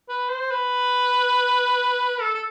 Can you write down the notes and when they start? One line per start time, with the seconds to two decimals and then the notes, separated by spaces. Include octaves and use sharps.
0.09 B4
0.29 C5
0.51 B4
2.20 A4
2.35 A4